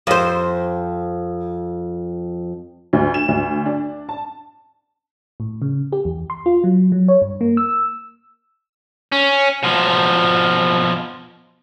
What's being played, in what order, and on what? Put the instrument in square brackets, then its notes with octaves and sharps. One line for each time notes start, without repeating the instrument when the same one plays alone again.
[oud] F2 C5
[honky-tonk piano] D2
E7
D2
D4
A5
[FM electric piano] A2
C#3
G4
E2
C6
F4
F#3
F#3
C#5
G2
A#3
E6
[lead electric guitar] C#4
B2 F3